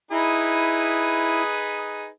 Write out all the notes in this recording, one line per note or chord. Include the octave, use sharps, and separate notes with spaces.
D#4 E4 G#4 B4